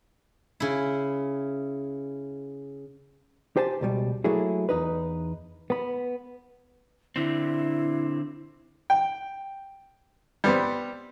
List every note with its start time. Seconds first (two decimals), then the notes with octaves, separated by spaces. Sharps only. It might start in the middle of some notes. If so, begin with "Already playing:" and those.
0.60 C#3 E4
3.56 G4 C5 G#5 A5
3.81 C#2 B2 G3
4.24 F#3 A3 A#3 E4 G#4
4.69 E2 D#4 B4
5.70 B3 B5
7.16 D3 C4 E4
8.90 G5
10.44 G3 B3 C4